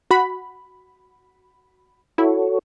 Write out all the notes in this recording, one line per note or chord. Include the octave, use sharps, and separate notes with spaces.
F#4 B5
E4 F#4 A4 C#5